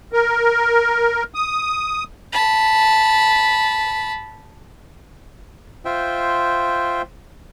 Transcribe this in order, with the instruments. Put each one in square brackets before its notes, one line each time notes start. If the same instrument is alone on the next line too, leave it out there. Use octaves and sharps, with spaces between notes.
[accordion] A#4
D#6
[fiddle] A5 B5
[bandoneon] F4 C5 E5 G5